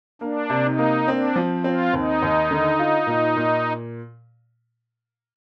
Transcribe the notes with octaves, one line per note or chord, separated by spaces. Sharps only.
A#3 D4
C3
D#4
A#3
C4 D4
F3
C4 F4
D#2 D#4
D#2
D3
F4
A#2
A#2